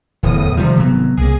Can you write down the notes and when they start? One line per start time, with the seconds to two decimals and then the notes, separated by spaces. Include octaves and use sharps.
0.23 D1 E2 A2 D#6
0.57 C3 D#3 F3 G3
0.77 G#1 C3 F#3 B3
1.17 C2 A#3 G#4